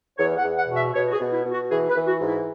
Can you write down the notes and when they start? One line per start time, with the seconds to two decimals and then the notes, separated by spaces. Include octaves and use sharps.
0.17 E2 C#5
0.37 F#5
0.43 E2
0.56 F#5
0.69 B2
0.74 E5
0.94 B2 C#5
1.08 F#4
1.13 G#4
1.19 B2
1.32 E4
1.45 B2
1.51 F#4
1.69 E3 G#4
1.89 B4
1.96 E3
2.07 F#4
2.20 G#2
2.26 E4